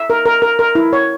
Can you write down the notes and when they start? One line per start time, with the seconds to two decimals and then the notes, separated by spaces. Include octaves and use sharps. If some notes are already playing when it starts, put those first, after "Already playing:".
Already playing: E5
0.10 A#4
0.26 A#4
0.42 A#4
0.59 A#4
0.75 E4
0.93 C#5